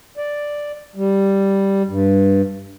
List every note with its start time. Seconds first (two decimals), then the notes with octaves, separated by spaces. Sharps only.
0.17 D5
0.96 G3
1.88 G2